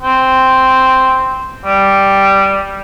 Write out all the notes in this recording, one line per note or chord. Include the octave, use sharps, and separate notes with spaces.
C4
G3